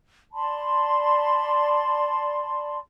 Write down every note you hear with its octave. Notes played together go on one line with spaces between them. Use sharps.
D5 A5 B5 C6